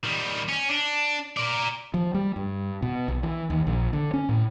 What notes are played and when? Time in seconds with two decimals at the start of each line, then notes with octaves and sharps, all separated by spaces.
0.04 D#3 G3
0.49 C#4
0.70 D4
1.37 A#4 D5
1.94 F3
2.14 G3
2.36 G2
2.82 B2
3.08 B1
3.23 E3
3.50 D#2
3.67 A#1
3.93 D3
4.13 C#4
4.29 A2